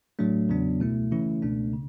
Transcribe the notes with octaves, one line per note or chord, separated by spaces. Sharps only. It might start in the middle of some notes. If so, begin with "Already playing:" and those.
A2 F#3 A3 D4
E2 C#3 F#3 B3 D4
C#2 B2 A3 E4
C#3 E3 A3 C#4 E4
C#2 B2 A3 D4
C#3